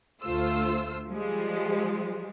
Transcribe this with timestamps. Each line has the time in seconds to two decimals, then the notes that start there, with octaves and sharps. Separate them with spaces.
0.23 D2 A3 F4 C5 E6
1.08 F3 G3 G#3